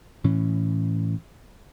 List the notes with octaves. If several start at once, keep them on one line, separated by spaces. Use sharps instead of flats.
A2 E3 C#4